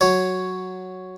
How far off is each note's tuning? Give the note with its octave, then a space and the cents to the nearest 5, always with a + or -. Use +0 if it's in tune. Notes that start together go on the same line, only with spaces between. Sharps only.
F#3 +0 C#5 +0